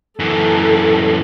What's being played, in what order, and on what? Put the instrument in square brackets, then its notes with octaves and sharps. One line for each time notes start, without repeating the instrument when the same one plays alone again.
[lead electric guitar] F#2 E3 [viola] A4